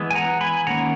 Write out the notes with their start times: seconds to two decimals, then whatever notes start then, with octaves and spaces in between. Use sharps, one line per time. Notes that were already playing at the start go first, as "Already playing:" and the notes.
Already playing: E3 G#3 B3
0.11 G#5
0.15 F#5 A#5
0.41 G#5 B5
0.67 D#3 A#3 C#4 F#5 A#5